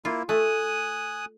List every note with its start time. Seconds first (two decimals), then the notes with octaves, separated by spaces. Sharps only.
0.05 A#3 E4 F4
0.29 A3 G#5 D#6 F#6